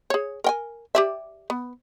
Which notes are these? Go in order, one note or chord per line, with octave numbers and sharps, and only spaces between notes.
G#4 C#5
A#4 G5 G#5
G4 D5 E5
B3